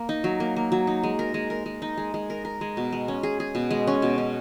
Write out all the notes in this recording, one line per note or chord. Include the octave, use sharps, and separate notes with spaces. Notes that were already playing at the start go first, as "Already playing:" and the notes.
Already playing: A#3
D#4
F#3
A#3
A#3
F#3
D#4
G#3
A#4
G#3
A#4
G#3
D#4
G#3
G#3
A#4
A#4
G#3
B2
G#3
C#4
G#4
G#4
B2
G#3
C#4
B2
C#4